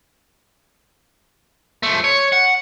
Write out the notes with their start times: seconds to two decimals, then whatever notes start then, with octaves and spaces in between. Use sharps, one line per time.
1.83 F3 A3
2.04 C#5
2.32 F#5